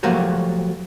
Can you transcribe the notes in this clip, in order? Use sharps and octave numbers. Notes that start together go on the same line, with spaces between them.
F3 F#3 A3 A#3 F#4 G4